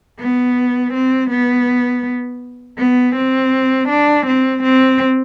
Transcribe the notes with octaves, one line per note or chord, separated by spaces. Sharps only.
B3
C4
B3
B3
C4
D4
C4
C4